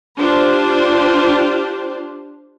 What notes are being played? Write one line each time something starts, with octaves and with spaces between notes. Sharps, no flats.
D4 F4 G4 C5